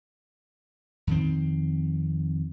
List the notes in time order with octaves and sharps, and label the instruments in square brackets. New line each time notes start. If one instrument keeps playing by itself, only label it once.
[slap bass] F2 D#3 C4